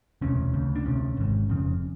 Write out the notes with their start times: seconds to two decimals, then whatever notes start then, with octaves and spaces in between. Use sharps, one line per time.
0.21 E1 D2 C3 C#4
0.54 D2 C#3
0.76 D4
0.85 D2 C3 C#4
1.17 G#1 G#2
1.49 F1 F2 C#3